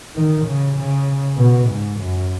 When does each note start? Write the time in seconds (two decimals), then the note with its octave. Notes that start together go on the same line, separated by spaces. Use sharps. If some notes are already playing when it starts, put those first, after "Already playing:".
0.15 D#3
0.45 C#3
0.76 C#3
1.37 B2
1.68 G#2
1.99 F#2